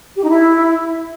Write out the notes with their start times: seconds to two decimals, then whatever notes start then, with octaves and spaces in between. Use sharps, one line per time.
0.17 G4
0.23 D#4
0.30 E4